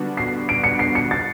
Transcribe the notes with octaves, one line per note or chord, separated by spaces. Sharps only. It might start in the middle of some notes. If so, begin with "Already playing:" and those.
Already playing: D3 G3 B3 D4 F#4
C7
D7
C#7
C7
C#7
A6